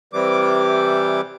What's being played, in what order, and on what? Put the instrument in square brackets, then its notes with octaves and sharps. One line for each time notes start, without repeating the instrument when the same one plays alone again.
[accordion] C3 E3 G3 D6